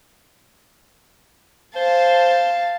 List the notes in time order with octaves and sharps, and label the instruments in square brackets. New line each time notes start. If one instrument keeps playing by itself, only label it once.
[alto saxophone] C5 [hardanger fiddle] F5 A5